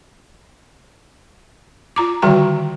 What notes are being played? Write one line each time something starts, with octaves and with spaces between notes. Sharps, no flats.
F4 A#5 D6
D3 D#3 G3 F#4 G5 A#5